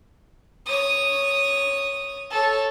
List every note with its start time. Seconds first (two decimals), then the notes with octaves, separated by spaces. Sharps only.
0.66 C#5 D#6
2.31 A4 C#5